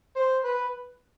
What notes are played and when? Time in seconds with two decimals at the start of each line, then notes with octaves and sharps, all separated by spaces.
0.16 C5
0.45 B4